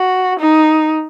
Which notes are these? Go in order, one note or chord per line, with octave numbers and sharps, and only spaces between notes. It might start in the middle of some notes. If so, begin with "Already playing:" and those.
Already playing: F#4
D#4